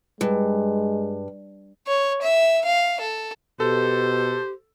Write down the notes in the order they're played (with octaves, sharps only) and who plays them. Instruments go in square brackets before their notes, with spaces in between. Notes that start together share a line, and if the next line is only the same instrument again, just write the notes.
[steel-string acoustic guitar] G2 [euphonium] G#3
[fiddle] C#5
E5
F5
A4
[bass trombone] B2 [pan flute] G4 [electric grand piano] A4 [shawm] C5